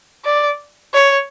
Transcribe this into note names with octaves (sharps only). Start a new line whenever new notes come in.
D5
C#5